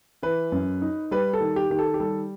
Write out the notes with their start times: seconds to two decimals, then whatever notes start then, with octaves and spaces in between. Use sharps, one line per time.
0.23 E3 B4
0.52 F#2
0.82 D#4
1.11 G3 B4
1.33 A4
1.40 D#3
1.56 G4
1.70 D#3 G4
1.79 A4
1.94 G4
2.00 G3 A4